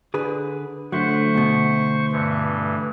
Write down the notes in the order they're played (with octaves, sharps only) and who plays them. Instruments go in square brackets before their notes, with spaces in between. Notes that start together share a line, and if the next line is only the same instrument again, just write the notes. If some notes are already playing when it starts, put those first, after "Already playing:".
[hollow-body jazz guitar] D3 G#4 B4
[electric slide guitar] D3 A3 F#5 [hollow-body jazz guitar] F#3 [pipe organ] C5 C#6
[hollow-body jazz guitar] D2 B2
[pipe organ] G2 E3